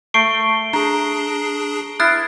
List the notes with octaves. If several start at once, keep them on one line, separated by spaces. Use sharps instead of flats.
A3 C#6 C7 D7 G7
D4 G#4 A#5
E4 D#6 F6 F#6 A6 C7